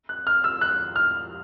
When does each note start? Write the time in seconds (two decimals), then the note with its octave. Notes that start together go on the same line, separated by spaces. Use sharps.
0.09 F#6
0.27 F6
0.44 E6
0.61 F#6
0.96 F6